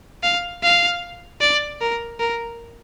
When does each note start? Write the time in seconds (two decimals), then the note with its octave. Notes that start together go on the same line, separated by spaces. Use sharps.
0.23 F5
0.63 F5
1.41 D5
1.81 A#4
2.20 A#4